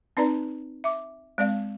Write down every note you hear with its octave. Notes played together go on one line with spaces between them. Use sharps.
C4 D#4 B4 D5 A#5
E5 D6
G#3 C4 D5 F5